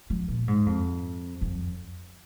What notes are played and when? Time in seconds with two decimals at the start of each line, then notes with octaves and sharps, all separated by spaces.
0.10 F3
0.28 A#2
0.48 G#2
0.66 F2
1.41 F2